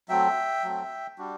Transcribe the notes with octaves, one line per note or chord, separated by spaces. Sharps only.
F#3 A3 C4 E5 G5
F#3 A3 C4
G3 D4 F#4